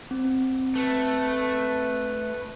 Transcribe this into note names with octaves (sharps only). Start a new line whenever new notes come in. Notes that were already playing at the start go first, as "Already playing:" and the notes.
C4
A3 B4